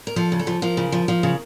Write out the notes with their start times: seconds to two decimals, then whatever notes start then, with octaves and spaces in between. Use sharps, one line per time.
0.07 A#4
0.16 F3 A4
0.32 C#3
0.39 A4
0.47 F3
0.62 F3 A#4
0.77 C#3
0.92 F3
1.08 F3
1.23 C#3